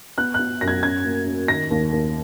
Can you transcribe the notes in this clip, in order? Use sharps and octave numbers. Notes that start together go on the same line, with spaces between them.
B3 F#6
B3 F#6
F#2 A#6
G#6
C#4 G#6
A#3
C#4
D#3 A#6
D#2
D#2